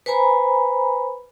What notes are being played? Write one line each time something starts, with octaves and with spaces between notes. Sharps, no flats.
B4 C5 G#5 A#5 B5